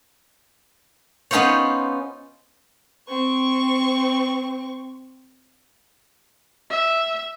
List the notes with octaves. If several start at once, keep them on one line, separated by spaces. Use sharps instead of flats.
B3 C#4 D#4 F4 C5 C#5
C4 C#6
E5